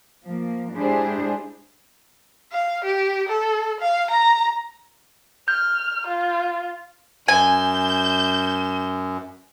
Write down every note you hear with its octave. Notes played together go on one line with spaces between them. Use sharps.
F3 A#3
G#3 D4 E4 G4 G#4 C5
F5
G4
A4
F5
A#5
F6 G6
F4
F#2 G#5 G6 E7